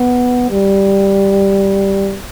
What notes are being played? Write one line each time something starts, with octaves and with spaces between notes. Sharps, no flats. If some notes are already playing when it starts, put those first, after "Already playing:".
Already playing: B3
G3